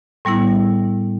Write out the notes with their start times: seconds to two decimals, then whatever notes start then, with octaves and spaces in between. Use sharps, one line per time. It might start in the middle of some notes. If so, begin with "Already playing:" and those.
0.25 A2 G3 B3 E4